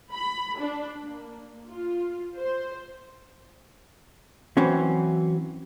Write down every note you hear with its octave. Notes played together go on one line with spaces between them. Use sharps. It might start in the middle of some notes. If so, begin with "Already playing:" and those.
B5
D4
A#3
F4
C5
E3 F#3 C4 C#4